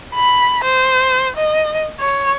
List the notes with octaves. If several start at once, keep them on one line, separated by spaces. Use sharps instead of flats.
B5
C5
D#5
C#5